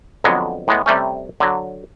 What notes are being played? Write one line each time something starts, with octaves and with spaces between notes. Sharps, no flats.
F2 D3 F#3 G#3 B3
A2 G#3 B3
C3 G3 A3 C#4
D3 F#3